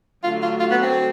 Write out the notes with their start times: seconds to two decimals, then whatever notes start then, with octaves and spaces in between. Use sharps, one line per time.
0.24 D3 F#3 A3 F4
0.42 F4
0.60 F4
0.71 B3
0.82 C4